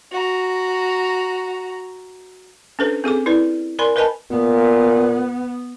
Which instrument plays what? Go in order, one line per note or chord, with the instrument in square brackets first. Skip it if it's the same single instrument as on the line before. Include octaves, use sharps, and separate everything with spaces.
[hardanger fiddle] F#4 A#5
[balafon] C#4 D4 A4 B4 C5
C4 G#4 A4 D6
E4 B4 D5
A#4 D5 G#5 B5 C6
A#4 B4 D#5 G#5 A5 B5
[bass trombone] A#2 [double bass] B3